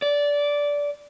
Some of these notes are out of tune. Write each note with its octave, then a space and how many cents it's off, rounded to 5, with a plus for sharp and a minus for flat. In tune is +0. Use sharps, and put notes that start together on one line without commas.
D5 -15